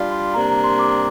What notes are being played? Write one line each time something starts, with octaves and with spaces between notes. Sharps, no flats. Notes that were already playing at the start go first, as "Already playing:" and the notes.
Already playing: G3 D4 F4 D5 F5
C6
C3 G3 A#3 D4 A#5
A#5
C6
D6